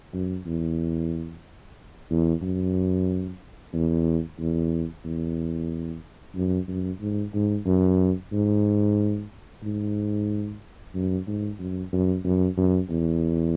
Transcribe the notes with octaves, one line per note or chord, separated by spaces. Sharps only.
F#2
E2
E2
F#2
E2
E2
E2
F#2
F#2
G#2
G#2
F#2
G#2
G#2
F#2
G#2
F#2
F#2
F#2
F#2
E2